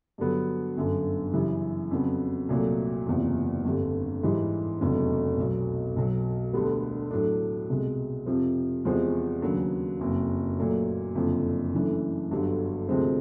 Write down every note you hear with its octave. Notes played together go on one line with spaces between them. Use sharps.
G2 D3 F#3 B3
G1 F#2 D3
F#2 C#3 E3 G3
F2 C#3 F#3 B3
C2 A#2 F#3 A3
F#1 E2 C3 F3
G1 F2 D3 G3
G#2 E3 G3
F1 E2 C#3 F#3
B1 B2 F#3
B1 B2 F#3
E1 D2 D3 G3 B3
A2 F#3 A3 D4
C2 B2 G#3
F2 C3 F3
E2 C3 F3 G#3 C4
D#2 C#3 F#3 B3 D4
F#1 F2 C#3 F#3
A#2 F#3 A3
F#1 F2 D3 F3
F#2 C#3 E3 A3 D4
G1 G2 D3 F#3
D2 C3 F3 G#3 C4